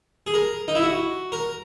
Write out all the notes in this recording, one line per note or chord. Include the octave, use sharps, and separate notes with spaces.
G#4
A#4
D#4
E4
F#4
A#4